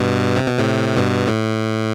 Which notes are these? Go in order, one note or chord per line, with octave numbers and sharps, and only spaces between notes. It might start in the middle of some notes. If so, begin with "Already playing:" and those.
Already playing: G2 B2
C3
B2
A2 C3
G2 B2
A2